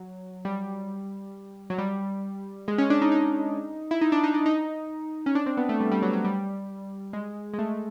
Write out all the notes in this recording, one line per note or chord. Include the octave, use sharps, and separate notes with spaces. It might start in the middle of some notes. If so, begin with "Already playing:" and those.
Already playing: F#3
G3
F#3
G3
G#3
C#4
D4
D#4
D#4
E4
D#4
D4
D#4
D4
D#4
C#4
D4
C4
B3
A3
G3
G3
F#3
F#3
G3
G#3
G#3
A3